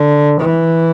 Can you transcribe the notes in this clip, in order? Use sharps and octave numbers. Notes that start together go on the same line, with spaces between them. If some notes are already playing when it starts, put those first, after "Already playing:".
Already playing: D3
E3